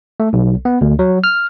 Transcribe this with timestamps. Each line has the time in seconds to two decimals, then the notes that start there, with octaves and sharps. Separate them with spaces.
0.20 A3
0.33 B1
0.65 B3
0.81 D2
0.99 F#3
1.24 F6